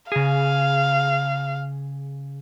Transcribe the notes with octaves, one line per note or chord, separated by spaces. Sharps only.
C#3 G#4 F5